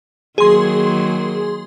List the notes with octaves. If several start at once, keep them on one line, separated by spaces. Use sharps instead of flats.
D#3 F#3 A#3 G#4 C6